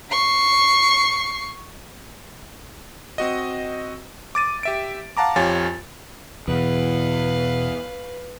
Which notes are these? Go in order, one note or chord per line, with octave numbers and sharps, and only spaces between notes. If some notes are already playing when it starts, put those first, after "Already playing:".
C#6 C7
C4 F#4 D#5
D6 A6 D#7
G4 E5 D7
F5 F#5 A5 A#5 D6
F2 F4 G4 C#5 G#5 A6
E2 B2 B4 F5